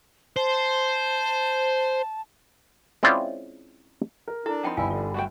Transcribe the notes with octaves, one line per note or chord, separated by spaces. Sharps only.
C5 A5
G#3 C4 C#4 E4 F4 D5
A#4
D4 E4 A4
F3 C4 D#4 F#5 G5 B5
G1 G3 E4 F4 F5 G#5
D3 F4
F#3 A3 F#4 G5